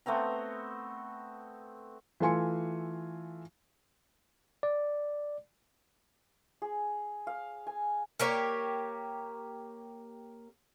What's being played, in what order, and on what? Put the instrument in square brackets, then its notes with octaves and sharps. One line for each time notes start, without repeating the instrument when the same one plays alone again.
[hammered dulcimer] A3 B3 C4 A#5
[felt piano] E3 A3 F4 G#5 C6 C#7
[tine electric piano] D5
[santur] G#4
F5
G#5
[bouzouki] A#3 G4 C#5